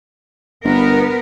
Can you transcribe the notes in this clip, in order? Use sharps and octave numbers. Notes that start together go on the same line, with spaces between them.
G1 B3 A#4 B4